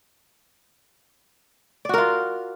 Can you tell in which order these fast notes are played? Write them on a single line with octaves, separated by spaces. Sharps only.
D5 F#4 A#4 F4